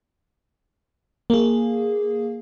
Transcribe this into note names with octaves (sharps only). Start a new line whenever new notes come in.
A#3 G#4